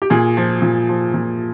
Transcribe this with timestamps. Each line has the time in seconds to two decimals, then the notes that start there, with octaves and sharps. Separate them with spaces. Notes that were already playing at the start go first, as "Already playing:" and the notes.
0.02 G4
0.10 A#2 G#4
0.37 F3
0.62 A#2
0.89 F3
1.14 A#2